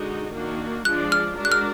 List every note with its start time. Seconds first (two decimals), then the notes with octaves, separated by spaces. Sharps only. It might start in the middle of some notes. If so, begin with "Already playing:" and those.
Already playing: D3 G#3 D#4 F#4
0.34 D#3 A#3 D4 F#4
0.85 F3 G#3 D4 G#4 D5 F#6
1.12 F6
1.37 G#3 D4 F#4 A#4 D5
1.45 F#6
1.52 F6